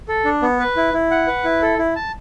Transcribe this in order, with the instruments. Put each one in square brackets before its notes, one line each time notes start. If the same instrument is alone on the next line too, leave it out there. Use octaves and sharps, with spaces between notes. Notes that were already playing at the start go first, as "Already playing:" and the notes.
[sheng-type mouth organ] A4
D4
B3
B4
E4
E4
F#5
B4
E4
A4
E4
A5